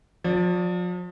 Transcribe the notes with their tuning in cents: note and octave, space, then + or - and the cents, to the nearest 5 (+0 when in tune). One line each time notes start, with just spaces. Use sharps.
F3 +40 D5 +0